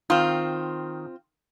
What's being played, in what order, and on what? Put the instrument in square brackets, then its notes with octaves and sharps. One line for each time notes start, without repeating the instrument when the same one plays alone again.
[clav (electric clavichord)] D#3 [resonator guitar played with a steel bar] C4 F4